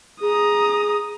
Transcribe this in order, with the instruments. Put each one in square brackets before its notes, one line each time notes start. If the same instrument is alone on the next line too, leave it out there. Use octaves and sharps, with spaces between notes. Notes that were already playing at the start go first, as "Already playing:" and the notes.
[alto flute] G#4 [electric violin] A#5 D#6